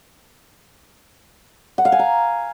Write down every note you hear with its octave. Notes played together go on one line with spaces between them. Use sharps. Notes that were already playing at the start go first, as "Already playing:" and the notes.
F#5
F5
G#5
A#5